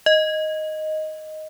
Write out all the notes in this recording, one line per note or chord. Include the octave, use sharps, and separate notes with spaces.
D#5